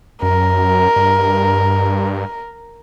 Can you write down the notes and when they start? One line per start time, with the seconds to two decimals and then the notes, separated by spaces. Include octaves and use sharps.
0.22 F#2 A#4
0.96 G2